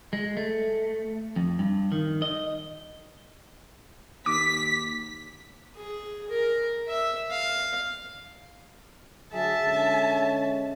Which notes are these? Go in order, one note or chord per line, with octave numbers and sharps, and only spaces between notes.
G#3
A3
F2
G2
D#3
D#5
D#2 D6 B6
G#4
A#4
E5
F5
D2 F#3 G#4 E5 A5
D3 G#3 C#4